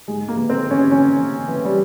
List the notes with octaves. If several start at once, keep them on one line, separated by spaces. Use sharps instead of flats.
G#2 G#3
A#3
E3
C4
E3
C#4
E3 C#4
E3
E3
G3